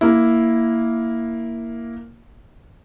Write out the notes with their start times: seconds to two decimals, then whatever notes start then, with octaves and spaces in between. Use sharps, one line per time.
0.01 A#3 E4